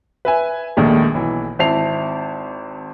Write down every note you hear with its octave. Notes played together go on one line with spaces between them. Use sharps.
B4 E5 G#5
A#1 D#2 D#3 G#3 A3
B1 E3
G#1 C4 E4 A5 C7 F7